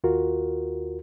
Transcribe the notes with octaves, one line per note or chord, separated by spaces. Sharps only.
D#2 F4 F#4 A#4